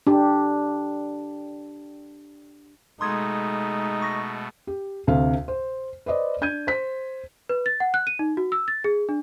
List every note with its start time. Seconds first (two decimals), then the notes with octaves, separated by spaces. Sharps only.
0.07 D4 G4
3.01 B2 G#3 A3 D#4 C6 D#6 G#6
4.02 C#6 A#6
4.67 G4
5.07 D2 C3 A4 F5
5.48 C5
6.06 B4 C5 D5 D#5
6.41 D4 G6 G#6 D#7
6.67 C5 B6
7.49 B4
7.66 A6
7.80 F#5
7.94 F#6
8.07 D#7
8.19 D#4
8.37 F#4
8.52 E6
8.68 A6
8.84 G#4
9.09 D4